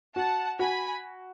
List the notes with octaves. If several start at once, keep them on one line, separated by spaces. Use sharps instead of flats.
F#4 F#5 A5
F#4 G#5 B5